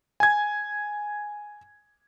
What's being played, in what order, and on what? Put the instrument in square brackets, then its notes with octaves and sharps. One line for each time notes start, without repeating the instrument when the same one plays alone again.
[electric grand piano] G#5 G#6